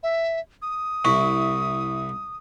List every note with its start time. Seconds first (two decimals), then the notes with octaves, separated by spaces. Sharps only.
0.03 E5
0.62 D#6
1.05 C2 E4 C#6